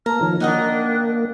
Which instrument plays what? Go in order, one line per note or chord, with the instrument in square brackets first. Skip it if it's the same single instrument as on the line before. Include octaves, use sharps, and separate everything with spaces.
[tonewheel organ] A#3 [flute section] A5 F6 [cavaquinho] A#5
[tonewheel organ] D#3 F3 [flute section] C#5
[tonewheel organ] A#3 [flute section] D4 G5 F#6 [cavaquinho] D#4 F#4 D#5